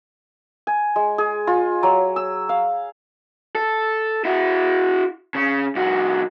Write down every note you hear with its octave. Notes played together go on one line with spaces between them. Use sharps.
G#5
G#3
G#4
F4
F#3
E6
F5
A4
E4 F#4
C#3 C#4
C2 F#4